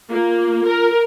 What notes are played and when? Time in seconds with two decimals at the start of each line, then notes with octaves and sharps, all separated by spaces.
0.10 A#3 F4
0.66 A#4